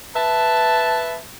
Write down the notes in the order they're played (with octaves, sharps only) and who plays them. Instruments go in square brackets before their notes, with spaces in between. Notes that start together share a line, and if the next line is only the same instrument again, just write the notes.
[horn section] B4 E5 A5